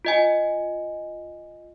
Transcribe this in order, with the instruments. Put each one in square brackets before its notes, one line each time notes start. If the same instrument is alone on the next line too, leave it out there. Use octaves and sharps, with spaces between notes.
[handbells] F4 D#5 G#5